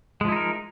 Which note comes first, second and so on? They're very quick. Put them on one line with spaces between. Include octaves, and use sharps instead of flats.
G#3 F3 E4 D#4 A#4